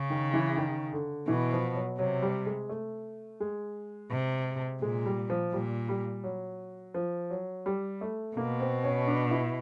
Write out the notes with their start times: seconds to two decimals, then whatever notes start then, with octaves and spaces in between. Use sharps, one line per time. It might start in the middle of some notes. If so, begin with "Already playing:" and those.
Already playing: C#3
0.10 D#3
0.33 E3
0.57 D#3
0.93 D3
1.28 B2 E3
1.52 F3
1.75 F#3
1.98 C3 F#3
2.22 G3
2.46 G#3
2.69 A3
3.40 G#3
4.11 C3
4.82 A#2 G#3
5.06 G3
5.30 F3
5.52 A#2 G3
5.89 G3
6.24 F#3
6.94 F3
7.30 F#3
7.66 G3
8.01 A3
8.36 B2 A#3
8.60 C4
8.84 C#4
9.07 D4
9.31 E4